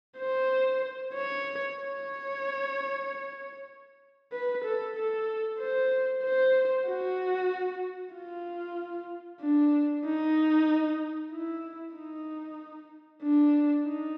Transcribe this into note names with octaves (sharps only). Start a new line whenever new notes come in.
C5
C#5
C#5
B4
A4
A4
C5
C5
F#4
F4
D4
D#4
E4
D#4
D4
D#4